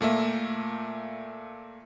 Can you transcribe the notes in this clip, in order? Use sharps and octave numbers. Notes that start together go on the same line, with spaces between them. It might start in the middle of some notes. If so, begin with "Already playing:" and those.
A#2 A3 A#3 E5